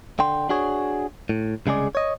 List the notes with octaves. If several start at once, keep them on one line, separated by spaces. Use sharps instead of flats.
D3 G5 C6
D4 F#4 G#4 C#5
A2
C2 C#3 G#3 G#4 D5
C#5 D#5